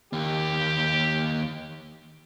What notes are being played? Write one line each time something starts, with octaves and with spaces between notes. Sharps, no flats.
D#2 A#3 G4